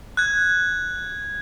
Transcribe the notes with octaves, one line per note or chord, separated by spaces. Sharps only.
F#6 G#6